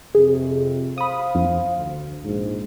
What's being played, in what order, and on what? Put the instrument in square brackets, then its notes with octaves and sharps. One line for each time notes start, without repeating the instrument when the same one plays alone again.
[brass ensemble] F2 C3 [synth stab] G#4
[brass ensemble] C5 F5 [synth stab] B5 D#6
[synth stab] F2
[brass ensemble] D2
A#1 G#2